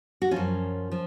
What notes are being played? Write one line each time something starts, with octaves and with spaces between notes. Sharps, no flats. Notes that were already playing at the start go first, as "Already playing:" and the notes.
F#4
F#2 F3 C#4 F4
F3